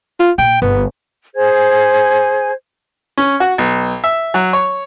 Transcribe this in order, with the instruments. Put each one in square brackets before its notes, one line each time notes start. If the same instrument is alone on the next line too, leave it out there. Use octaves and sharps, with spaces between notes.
[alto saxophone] F4
[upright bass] A#2 [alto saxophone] G5
[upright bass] G1 [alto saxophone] B3
[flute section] G#4 C5 G#5 G#6
[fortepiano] C#4
F#4
B1
E5
F#3
C#5